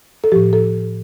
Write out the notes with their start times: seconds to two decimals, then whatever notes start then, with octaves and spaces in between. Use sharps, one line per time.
0.24 A4
0.32 A2 F3 G4
0.53 A4